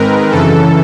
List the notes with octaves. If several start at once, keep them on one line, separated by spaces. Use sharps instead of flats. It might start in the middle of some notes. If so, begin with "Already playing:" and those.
Already playing: G#2 D#3 G#3 C4 A#4 B4
F#2 C#3 E3 A4